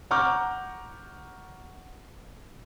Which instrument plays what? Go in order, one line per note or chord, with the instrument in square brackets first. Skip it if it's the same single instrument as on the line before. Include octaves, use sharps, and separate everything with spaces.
[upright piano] F#5 A#5 C#6 D6 F6 G6